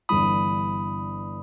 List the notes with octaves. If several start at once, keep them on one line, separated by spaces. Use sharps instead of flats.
G1 G2 E3 B5 D#6